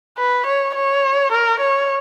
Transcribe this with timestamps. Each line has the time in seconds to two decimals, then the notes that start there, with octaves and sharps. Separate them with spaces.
0.18 B4
0.47 C#5
0.75 C#5
1.32 A#4
1.60 C#5